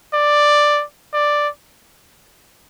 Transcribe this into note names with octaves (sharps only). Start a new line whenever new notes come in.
D5
D5